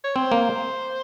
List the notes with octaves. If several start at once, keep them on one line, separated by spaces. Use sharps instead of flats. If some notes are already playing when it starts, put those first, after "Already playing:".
C#5
C4 C5
A#3